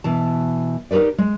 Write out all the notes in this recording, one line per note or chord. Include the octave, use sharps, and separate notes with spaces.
B2 E3 A5
D#4 G4 A#4 B4 D5
G#3